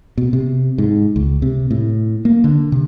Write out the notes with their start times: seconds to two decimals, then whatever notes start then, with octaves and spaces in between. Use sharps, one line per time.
0.18 B2
0.33 C3
0.78 G#2
1.16 C#2
1.42 C3
1.71 A2
2.25 A#3
2.44 D3
2.72 C3